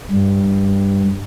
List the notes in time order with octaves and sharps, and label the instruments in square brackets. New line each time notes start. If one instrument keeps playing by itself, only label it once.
[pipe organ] G2